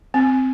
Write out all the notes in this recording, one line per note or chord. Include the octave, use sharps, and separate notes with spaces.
C4